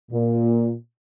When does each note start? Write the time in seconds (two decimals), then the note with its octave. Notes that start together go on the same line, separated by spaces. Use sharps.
0.11 A#2